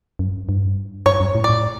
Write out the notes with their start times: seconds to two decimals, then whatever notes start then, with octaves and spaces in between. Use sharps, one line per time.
0.19 F#2
0.49 G2
1.06 G2 C#5
1.20 F#2
1.35 A2
1.44 D5
1.49 A2